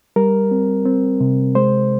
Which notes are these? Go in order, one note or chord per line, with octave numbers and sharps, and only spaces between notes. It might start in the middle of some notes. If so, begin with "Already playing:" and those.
G3 A#4
C4
C4
C3
G#3 C5